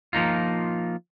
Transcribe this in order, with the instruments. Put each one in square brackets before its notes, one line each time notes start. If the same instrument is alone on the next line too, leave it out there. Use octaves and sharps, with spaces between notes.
[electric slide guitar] F3 A#3 D#4 F4